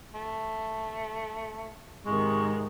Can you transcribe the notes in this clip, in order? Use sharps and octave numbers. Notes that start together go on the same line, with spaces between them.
A3
G#2 C3 D#3 G#3 C#6